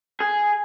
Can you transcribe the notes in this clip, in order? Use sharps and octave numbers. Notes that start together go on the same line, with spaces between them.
G#4